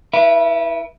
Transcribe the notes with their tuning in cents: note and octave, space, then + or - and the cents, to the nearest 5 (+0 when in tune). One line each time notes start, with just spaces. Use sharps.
E4 -20 B4 -25 E5 +30